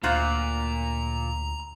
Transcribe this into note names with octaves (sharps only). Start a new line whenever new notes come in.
D2 A#2 F4 F#4 C5 A#5